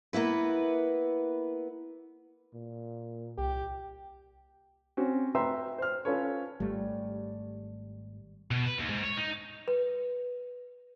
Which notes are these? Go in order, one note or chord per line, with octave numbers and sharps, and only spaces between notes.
A#3 B3 E4 B4
A#2
C2 G4
C4 C#4 F#4
B4 E5 G5 A#5 C6 E6
C5 F6
C#4 F4 A4 B4 C#5
G#1 G3 A3
B2
B4
D#2
G#2
C#5
D#4
B4